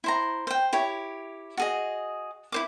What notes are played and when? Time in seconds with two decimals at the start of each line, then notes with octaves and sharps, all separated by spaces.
0.04 E4 C5 A#5
0.47 C5 G5
0.73 E4 G4 C#5
1.57 F#4 G#4 D#5
2.52 E4 C5 D6